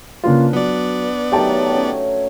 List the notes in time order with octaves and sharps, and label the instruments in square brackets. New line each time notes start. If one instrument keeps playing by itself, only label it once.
[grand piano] C#3 A#3 F4 [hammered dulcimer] D4 B4
[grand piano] F#3 [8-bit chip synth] B3 D5
[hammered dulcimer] D#3 F#3 A3 [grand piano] G4 G5 A5
[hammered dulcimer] C#4